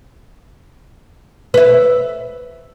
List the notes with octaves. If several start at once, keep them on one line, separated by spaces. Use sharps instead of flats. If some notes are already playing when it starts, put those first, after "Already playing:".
B4 E5